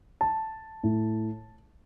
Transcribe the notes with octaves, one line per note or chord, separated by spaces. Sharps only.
A5
A2